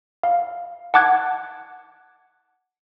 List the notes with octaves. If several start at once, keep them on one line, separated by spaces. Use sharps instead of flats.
F5
F#5 A5 D6 F#6 G#6